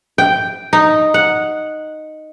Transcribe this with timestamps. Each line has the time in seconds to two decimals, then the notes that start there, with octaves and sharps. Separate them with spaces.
0.18 G5
0.73 D#4
1.14 F#5